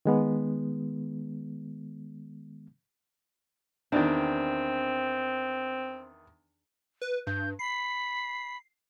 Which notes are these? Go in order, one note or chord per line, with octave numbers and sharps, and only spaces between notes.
D#3 G#3 B3
E2 D#3 C4 D4
B4
G2 G6
B5 C7